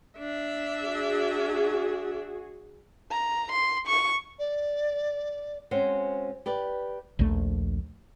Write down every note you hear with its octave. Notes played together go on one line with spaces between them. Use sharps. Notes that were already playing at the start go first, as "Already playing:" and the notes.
D4 E5
F#4 G#4
A#5
C6
C#6
D5
G#3 C4 C#4 F#4 C5
G4 B4 D5
A#1 D#2 A#2 A3